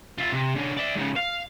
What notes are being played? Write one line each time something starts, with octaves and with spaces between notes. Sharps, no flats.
F4 E5
C3
D3 C#4
D5 E5
G#2 C#3
F5